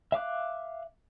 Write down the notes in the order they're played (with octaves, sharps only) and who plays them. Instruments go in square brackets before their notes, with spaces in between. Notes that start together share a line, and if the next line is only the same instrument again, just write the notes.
[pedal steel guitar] E5 F5 D6 F#6